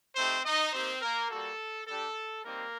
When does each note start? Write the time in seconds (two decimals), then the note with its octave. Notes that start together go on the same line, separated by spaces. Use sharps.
0.16 A3 C4 D#4 G4 C5
0.45 D#4 D#5
0.73 A#3 C4 D#4 G4 C5
1.02 A#3 A#4
1.30 G3 A#3 F#4 A4
1.87 G3 D4 G4 A4
2.44 G3 A#3 C4 D#4 A#4